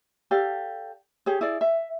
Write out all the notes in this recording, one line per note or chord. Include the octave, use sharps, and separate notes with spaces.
G4 A4 D5 F5
G4 G#4 C#5
E4 G#4 D5
E5